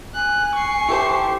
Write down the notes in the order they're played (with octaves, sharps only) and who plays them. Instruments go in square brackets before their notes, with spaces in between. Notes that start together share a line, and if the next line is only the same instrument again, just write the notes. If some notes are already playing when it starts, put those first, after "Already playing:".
[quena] G#5 [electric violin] F#6
[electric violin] C#6 C7
[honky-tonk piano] E4 A4 C5 [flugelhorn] G4